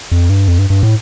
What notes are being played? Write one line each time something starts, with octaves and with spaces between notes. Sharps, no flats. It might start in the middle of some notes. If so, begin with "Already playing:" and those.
F2
G2
F2
G2
G2
A2